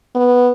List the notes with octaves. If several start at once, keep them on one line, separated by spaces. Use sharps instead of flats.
B3